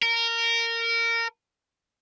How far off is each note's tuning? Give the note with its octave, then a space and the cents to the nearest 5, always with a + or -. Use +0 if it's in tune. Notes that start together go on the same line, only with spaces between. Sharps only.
A#4 -15